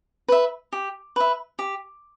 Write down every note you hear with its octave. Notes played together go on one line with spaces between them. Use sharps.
B4 E5
G4
B4 E5
G4